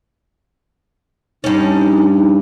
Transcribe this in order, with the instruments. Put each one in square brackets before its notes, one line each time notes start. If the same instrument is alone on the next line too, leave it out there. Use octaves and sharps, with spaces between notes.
[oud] G2 C#4 [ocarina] D#4